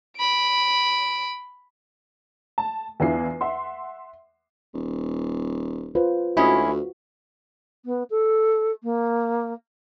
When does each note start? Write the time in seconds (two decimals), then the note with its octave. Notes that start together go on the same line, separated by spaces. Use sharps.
0.18 B5 D7
2.58 A5
3.00 E2 D4 E4 F4 C7
3.41 E5 F#5 C6
4.74 D#1
5.95 F4 B4 C5
6.37 D2 G#3 C#4 E4 F#4
7.85 B3
8.10 A4
8.83 A#3